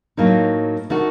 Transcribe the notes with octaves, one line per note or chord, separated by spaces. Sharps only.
A2 F#3 A#3 D#4
D#3 A3 D#4 F#4